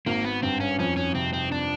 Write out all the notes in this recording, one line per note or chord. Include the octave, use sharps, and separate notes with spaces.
G#1 A#3
B3
G2 C4
C#4
F2 C#4
C#4
C3 C4
C4
D4